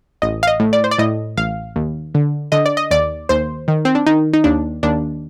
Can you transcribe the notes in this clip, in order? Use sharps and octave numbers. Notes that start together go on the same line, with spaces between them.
A1 D#5
F5
D#5
A2
D5
C5
D5
A2 D#5
A1 F5
D#2
D3
D3 D#5
D5
D#5
D#2 D5
D#2 C5
D#3
C4
D4
D#3 D#4
D#4
D#2 D4
D#2 D4